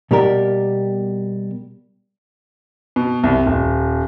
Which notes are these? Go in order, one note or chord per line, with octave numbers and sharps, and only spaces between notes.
B2 G3 A#3 G4 A#4
B2
C2
D#1